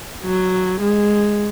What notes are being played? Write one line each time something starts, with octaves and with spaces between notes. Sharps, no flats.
F#3
G#3